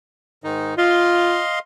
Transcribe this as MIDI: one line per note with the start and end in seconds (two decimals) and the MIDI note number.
0.44 0.74 44
0.44 0.74 51
0.44 0.74 63
0.78 1.39 65
0.78 1.59 75
0.78 1.59 77
0.78 1.59 84